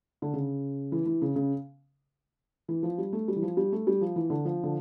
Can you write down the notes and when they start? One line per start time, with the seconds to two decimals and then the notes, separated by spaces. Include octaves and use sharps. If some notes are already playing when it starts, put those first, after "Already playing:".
0.22 D3
0.33 C#3
0.92 E3
1.06 E3
1.22 C#3
1.36 C#3
2.68 E3
2.83 F3
2.98 G3
3.13 A3
3.28 G3
3.36 E3
3.42 F3
3.57 G3
3.72 A3
3.87 G3
4.01 F3
4.16 E3
4.30 D3
4.45 F3
4.64 D3